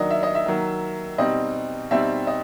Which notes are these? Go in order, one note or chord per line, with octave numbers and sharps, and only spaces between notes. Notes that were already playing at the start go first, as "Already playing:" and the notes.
Already playing: D#3 F#3 A#3 D4 D#5
E5
D#5
E5
D#3 F#3 A#3
B2 G3 C4 D#4 D#5
B2 G3 C4 D#4 E5
D#5